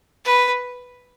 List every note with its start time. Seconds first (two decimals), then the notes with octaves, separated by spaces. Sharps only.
0.25 B4